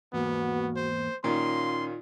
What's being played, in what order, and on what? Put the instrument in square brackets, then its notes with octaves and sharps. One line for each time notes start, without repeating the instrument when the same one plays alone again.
[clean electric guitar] E2 G#2 A#3 [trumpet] B3 [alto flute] F#4
[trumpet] C5
[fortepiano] A#2 D#3 [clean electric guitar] C#4 [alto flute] F4 [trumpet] C6